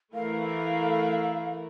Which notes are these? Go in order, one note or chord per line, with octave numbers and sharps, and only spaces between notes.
E3 A3 E4 A#4 F5